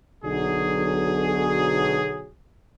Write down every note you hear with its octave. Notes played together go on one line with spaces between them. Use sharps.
B1 D3 F#3 G#4